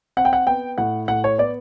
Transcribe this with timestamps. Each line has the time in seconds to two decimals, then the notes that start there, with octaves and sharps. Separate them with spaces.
0.17 C4 F#5
0.25 G5
0.33 F#5
0.47 B3 G5
0.78 A2 F#5
1.08 A2 F#5
1.24 C#5
1.38 B3 D5